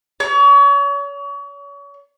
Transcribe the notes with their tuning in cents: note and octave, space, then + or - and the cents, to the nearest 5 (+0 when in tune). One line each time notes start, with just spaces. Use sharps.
C#5 +35